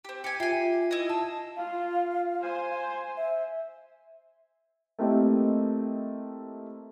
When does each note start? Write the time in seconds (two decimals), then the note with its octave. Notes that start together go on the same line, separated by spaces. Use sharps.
0.05 C4 G4
0.24 G4 G#5 C#7
0.40 F4 G4 E5 G#5 C7
0.91 E4 D#5
1.09 A5 E6
1.57 F4 F5
2.41 C5 G#5
3.17 E5
4.99 A3 A#3 C4 E4 G4 D#5